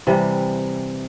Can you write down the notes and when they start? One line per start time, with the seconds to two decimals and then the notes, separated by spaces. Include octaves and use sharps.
0.07 C3 E3 G3